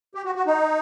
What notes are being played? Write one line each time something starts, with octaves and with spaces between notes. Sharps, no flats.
G4
F#4
F#4
D#4